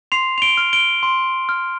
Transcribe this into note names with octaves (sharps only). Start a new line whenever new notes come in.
C6 C7 F7
F7
D7 G7
F6
D7 G7
C6
F6